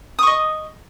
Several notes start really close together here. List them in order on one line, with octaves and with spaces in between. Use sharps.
D#6 C#6 D#5